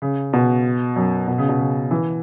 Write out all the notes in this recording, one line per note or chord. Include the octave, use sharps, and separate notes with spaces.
C#3
B2
F#2
B2
C#3
B2
C#3
E3